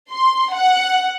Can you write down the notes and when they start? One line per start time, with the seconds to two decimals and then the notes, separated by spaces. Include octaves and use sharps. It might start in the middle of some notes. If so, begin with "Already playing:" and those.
0.10 C6
0.52 F#5